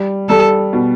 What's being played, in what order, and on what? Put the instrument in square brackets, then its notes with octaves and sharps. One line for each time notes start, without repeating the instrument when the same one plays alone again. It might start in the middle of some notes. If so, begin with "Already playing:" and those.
Already playing: [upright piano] G3
[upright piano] G3 [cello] A4
[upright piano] B2